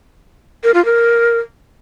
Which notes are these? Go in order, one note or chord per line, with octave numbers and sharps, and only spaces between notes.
A#4
F4
A#4